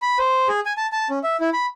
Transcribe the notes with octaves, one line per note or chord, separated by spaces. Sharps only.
B5
C5
G#4
G#5
A5
A5
C#4
E5
E4
B5